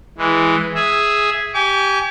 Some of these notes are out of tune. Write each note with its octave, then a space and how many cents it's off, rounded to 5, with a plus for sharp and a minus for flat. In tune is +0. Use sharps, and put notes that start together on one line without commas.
E3 +0 G#3 +0
G#4 +0 E5 +0
G4 +0 G#5 +0 D6 -45